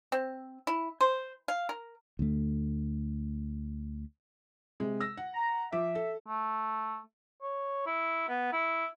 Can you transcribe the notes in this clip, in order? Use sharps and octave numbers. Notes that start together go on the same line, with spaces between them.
C4
E4
C5
F5
A#4
D2 A3
C3 G#3
E6 A#6
F#5
A#5
F3 E5 D6
A4
A3
C#5
E4
B3
E4